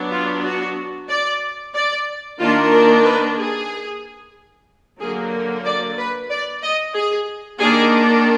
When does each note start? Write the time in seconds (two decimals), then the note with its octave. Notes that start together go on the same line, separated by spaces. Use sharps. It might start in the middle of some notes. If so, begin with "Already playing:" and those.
Already playing: F#3 B3 D4
0.11 F4
0.43 F#4
1.08 D5
1.74 D5
2.39 D#3 A#3 D4 F4
2.72 A#4
3.04 B4
3.37 G#4
5.00 D3 F#3 A#3 G#4
5.65 D5
5.97 B4
6.30 D5
6.62 D#5
6.94 G#4
7.59 D#3 A#3 D4 G#4